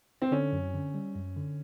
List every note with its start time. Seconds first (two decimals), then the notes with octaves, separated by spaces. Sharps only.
0.22 C4
0.32 D3 C#4
0.52 F#2
0.74 D3
0.94 G3
1.15 F#2
1.36 D3